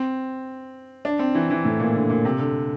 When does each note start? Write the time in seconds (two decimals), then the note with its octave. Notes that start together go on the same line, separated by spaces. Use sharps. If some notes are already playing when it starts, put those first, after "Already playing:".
Already playing: C4
1.05 D4
1.19 C4
1.35 E3
1.50 E3
1.65 A2
1.79 A#2
1.95 D3
2.10 A#2
2.25 C3
2.39 D3